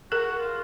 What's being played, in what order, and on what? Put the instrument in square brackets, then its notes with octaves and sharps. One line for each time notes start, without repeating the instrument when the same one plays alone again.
[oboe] F#4 [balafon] G#4 A#4
[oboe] F4